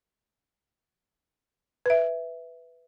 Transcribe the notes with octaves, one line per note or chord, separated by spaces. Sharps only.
B4 E5